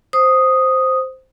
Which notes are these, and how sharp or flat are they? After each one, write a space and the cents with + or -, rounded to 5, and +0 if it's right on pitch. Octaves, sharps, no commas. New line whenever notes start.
C5 +0 D#6 +0